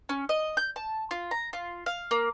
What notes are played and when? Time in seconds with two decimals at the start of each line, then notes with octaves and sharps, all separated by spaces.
0.09 C#4
0.29 D#5
0.57 G6
0.76 A5
1.11 F4
1.31 A#5
1.53 F4
1.86 F5
2.11 A#3